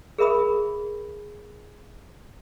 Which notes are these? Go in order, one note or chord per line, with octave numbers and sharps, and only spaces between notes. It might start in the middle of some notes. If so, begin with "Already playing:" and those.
G#4 A#4 E5 B5 D#6